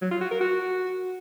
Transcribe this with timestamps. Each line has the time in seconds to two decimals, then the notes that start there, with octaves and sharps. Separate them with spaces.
0.02 F#3
0.11 F4
0.21 F#4
0.31 A#4
0.41 F#4